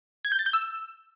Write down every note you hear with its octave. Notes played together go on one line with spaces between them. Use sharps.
G#6
G6
A6
G6
E6